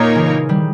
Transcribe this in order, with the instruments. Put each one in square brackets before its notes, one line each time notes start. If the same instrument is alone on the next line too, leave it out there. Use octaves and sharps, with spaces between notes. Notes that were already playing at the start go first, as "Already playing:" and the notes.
Already playing: [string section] A#2 A#3 D#4 A#4 C#5
[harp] C#3 E3
D#3 G3